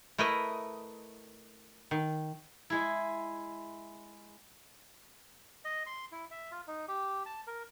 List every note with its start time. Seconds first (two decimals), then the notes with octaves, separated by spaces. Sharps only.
0.18 A3 E4 A#4 B4 D#5
1.91 D#3
2.70 G#3 E4
5.65 D#5
5.86 C6
6.12 E4
6.31 E5
6.51 F4
6.67 D#4
6.88 G4
7.26 A5
7.47 A#4